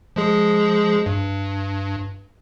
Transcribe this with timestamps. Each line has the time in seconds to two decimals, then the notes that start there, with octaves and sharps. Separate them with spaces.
0.16 F3 G#3 G#4
1.06 G2